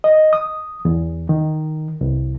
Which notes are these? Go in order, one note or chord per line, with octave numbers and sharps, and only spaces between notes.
D#5
D#6
E2
D#3
C2